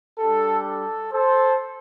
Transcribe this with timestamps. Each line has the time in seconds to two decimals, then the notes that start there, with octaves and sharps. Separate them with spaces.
0.18 G3 D4 G4 A4
0.66 A4
1.12 A4 C5